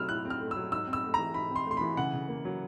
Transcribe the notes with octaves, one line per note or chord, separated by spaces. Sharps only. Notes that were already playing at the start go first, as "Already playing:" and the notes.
Already playing: F#3 A3 C4 E6 F6
A2 F#6
C4
F6
A3
F#3 E6
G#2 E6
C4
E6
A3
E3 A#5
G#2 B5
C4 C6
A3 C6
E3 B5
C#3 F#5
C#3
A#3
F#3